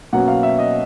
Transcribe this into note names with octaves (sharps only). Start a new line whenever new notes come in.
B2 F#3 A#3 C#4 F#5
F5
E5
D#5